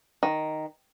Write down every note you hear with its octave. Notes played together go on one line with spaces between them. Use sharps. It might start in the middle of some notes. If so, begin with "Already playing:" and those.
D#3